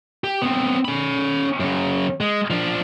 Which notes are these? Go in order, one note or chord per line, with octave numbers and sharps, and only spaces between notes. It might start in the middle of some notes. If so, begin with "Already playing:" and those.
G4
B3 C4
C#4 B5
F#2 C#3
G#3
F3 D4